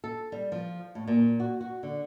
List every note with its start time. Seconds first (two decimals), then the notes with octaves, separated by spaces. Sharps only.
0.04 A4
0.32 G3
0.52 F3
0.95 A2
1.07 A#2
1.40 F#4
1.61 F#4
1.83 D3